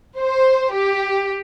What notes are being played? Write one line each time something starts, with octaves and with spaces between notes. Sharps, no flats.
C5
G4